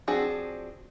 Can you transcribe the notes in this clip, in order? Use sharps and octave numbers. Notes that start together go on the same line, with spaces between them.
F3 C4 D4 F#4 G#4